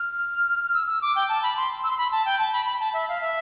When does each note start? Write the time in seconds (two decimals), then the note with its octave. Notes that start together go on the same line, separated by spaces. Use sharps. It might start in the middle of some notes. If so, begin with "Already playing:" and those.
Already playing: F6
0.63 F6
0.73 E6
0.86 E6
1.01 D6
1.15 G5
1.28 A5
1.43 B5
1.56 C6
1.83 E6
1.90 C6
1.97 B5
2.11 A5
2.25 G5
2.39 A5
2.52 B5
2.65 B5
2.79 A5
2.93 E5
3.08 F5
3.21 E5